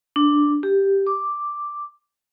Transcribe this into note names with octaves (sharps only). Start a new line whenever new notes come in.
D4
G4
D6